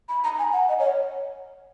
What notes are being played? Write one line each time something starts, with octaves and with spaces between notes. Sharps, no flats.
B5
A#5
G#5
F#5
D#5
C#5